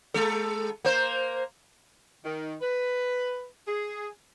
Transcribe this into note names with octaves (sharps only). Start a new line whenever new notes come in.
G#3 A4
A#3 C5
D#3
B4
G#4